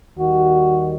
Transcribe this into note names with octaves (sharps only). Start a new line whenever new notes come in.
D#2 D#3 G3 F#4